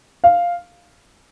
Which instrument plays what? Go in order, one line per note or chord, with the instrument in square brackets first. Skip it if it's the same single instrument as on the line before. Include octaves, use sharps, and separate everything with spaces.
[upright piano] F5